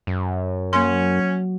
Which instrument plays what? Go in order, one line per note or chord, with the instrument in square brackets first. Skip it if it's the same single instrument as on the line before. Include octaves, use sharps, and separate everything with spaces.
[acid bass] F#2
[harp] F#3 [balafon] A#3 C6 [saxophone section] C#4